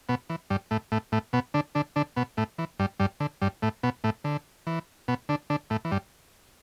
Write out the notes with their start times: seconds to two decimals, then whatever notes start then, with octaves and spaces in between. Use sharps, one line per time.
0.09 B2 B3
0.30 E3
0.50 G2 G3
0.71 A2 A3
0.92 A2 A3
1.12 A2 A3
1.33 B2 B3
1.54 D3 D4
1.75 D3 D4
1.96 D3 D4
2.16 B2 B3
2.37 A2 A3
2.58 E3
2.79 G2 G3
3.00 G2 G3
3.20 D3
3.42 G2 G3
3.62 A2 A3
3.83 B2 B3
4.04 A2 A3
4.24 D3
4.67 E3
5.08 B2 B3
5.29 D3 D4
5.50 D3 D4
5.70 A2 A3
5.85 E3
5.91 G2 G3